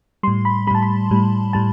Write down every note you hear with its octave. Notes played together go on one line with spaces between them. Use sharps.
A2 G3 C6
B5
A2 G3 A5 B5
B5
A2 G3
A2 G3 A5